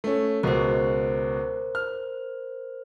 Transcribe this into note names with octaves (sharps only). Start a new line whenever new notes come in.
A3 C#4
C#2 B2 A#4 C5
F6